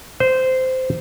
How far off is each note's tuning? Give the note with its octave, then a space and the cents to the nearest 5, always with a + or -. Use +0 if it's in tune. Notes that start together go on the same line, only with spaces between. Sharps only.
C5 -15